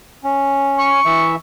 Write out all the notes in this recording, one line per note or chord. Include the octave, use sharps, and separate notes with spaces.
C#4
C#6
E3 E5